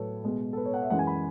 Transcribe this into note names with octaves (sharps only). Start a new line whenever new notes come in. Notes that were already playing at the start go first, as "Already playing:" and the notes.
Already playing: A2 F#3 A4 B4 C#5
B2 G#3
A4
B4
C#5
F#5
E5
F#2 E3 G#3 F#5
G#5
B5